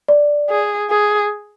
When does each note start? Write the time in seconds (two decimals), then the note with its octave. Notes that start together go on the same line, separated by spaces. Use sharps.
0.08 D5
0.49 G#4
0.90 G#4